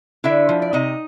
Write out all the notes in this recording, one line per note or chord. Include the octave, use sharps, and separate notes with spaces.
D3 E4 E5
F3
D5
C3 D#4 D#5